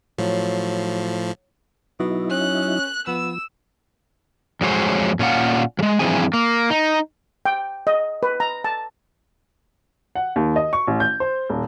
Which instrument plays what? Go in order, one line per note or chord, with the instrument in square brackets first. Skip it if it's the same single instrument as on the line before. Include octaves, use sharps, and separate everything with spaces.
[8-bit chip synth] A2 F3 [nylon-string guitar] F#3
[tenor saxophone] B2 [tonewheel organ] F#3 D#4 E4
[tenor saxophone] C#4 [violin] F#6
[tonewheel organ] F3 [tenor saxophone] B3 [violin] E6
[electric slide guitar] F2 F#3 G#3 C5 C#5
A#2 C#4 F4 F#5
F3 G#3
G2 E3 F3 C4 G#4 G#5
A#3
D#4
[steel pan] G5
D#5
B4
A#5
A5
[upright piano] F#5
D#2
D#5
C#6
A1
G6
C5
D#1